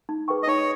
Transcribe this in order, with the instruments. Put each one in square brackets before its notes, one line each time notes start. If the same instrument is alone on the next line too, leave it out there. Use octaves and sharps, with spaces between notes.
[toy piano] D#4
G#4 B4 G5 C#6
[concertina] D#5
[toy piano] D#4 [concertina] C#5